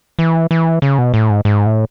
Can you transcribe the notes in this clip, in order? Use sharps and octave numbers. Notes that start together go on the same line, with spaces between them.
E3
E3
C#3
B2
A2
G#2
G#2
A2